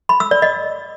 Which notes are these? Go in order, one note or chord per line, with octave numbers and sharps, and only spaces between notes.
B5
E6
D5
D#5